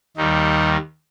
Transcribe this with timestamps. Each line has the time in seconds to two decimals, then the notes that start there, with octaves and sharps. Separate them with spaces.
0.17 D#2 D#3 G3 D#4